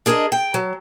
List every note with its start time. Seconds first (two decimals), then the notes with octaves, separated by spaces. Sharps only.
0.06 D4 G#4 A#4 C5 D#5
0.32 G5
0.54 F#3